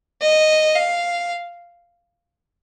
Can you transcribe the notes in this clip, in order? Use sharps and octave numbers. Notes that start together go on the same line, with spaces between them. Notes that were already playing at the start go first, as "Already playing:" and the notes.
D#5
F5